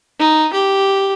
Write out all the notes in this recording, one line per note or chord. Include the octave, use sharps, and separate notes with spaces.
D#4
G4